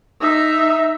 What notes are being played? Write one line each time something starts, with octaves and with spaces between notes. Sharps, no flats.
D#4 E5